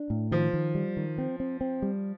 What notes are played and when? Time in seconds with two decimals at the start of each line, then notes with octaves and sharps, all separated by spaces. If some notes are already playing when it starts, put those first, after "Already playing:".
Already playing: D4
0.10 A2
0.31 D#3 F3
0.53 D#3
0.75 G3
0.97 D#3
1.18 C4
1.40 C4
1.61 C4
1.82 G3